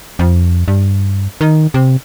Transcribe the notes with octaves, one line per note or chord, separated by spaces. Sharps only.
F2
G2
D#3
C3